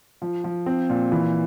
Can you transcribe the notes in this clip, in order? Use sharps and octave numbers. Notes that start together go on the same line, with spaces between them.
F3
F3
C4
A#2
E3